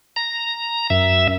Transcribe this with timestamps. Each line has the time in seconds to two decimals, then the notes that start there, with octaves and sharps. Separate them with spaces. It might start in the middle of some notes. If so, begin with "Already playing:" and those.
0.16 A#5
0.90 F#2 E5